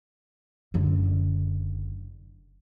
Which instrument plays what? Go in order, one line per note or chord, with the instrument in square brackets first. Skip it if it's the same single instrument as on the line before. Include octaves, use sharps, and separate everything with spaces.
[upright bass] F#1 D3